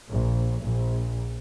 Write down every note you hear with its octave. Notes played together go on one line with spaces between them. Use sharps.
A#1
A#1